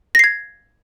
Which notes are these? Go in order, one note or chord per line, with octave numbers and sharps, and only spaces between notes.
G#6 A#6 C7